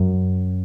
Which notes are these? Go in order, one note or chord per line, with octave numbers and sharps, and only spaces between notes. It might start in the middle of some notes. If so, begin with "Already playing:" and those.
Already playing: F#2